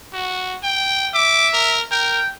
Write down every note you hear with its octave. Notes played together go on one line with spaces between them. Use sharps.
F#4
G5
E5 D6
A#4
A#4 G5